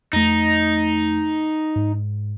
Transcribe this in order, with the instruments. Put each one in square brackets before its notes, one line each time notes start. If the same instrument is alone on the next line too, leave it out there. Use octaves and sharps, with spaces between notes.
[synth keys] F2 A3 [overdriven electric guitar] D#4
[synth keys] G#2